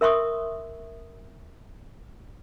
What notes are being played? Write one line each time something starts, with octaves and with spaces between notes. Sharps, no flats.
A#4 E5 C6 C#6 D#6